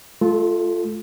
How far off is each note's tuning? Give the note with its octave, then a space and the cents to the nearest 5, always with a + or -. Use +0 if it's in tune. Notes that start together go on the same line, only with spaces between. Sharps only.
A3 -45 F4 +0 A4 +0